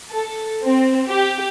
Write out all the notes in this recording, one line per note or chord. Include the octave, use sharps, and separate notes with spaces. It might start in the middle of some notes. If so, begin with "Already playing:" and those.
A4
C4
G4